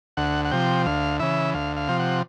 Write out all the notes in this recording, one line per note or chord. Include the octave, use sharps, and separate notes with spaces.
D2 F#5
F#5
C3 F3 G5
D2 F5
C#3 E3 E5
D2 F5
F5
C3 F3
F#5